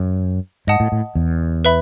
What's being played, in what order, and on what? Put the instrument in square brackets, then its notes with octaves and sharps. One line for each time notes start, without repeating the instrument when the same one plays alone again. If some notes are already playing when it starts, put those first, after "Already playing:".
Already playing: [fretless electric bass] F#2
[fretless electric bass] G#2 [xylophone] D#5 F#5 A5 D#6
[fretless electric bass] A2
A2
E2
[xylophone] B4 E5 B5